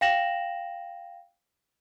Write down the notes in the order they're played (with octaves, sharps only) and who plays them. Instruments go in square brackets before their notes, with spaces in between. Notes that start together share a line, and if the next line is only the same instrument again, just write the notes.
[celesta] F5 G5 A#6 E7 F#7